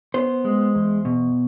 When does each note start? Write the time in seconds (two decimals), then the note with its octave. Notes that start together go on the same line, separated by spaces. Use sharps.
0.14 B3 C5
0.45 G#3
0.75 E2
1.05 B2